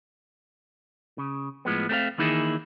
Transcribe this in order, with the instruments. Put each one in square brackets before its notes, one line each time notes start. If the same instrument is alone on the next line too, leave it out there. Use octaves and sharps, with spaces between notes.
[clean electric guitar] C#3
A2 F3 G#3 B3
A3 C4 A4 F5
D#3 E3 A#3 D#4 E4 G#4